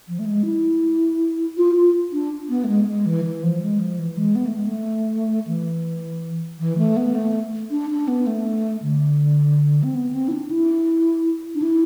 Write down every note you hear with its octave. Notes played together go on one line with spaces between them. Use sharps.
F3
A3
G#3
E4
F4
F4
D4
B3
A3
G#3
A3
G#3
E3
E3
F3
G#3
F3
E3
G#3
B3
A3
G#3
A3
E3
E3
A3
B3
A3
D4
D4
B3
A3
D3
C4
B3
C4
E4
D4
E4
D4
E4